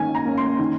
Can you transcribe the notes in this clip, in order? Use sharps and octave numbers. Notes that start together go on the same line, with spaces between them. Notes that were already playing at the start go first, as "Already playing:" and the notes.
Already playing: D#3 A#3 C#4 G#5
A#5
A#3 C#4
C6
D#3